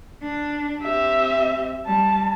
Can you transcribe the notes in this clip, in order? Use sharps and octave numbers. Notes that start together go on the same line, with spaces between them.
D4
C4 G4 E5
G3 A5